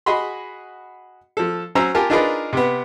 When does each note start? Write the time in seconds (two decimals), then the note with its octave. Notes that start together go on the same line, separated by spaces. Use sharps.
0.06 F#4 G#4 D#5 F#5 B5 C6
1.37 F3 A4
1.75 F#3 C#4 C5 A#5 E6
1.95 F4 G4 A#4 G#5 A5
2.10 D4 D#4 F4 G#4 A#4 B4
2.53 C3 B3